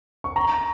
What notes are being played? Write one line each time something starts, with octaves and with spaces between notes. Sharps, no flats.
C#6
A#5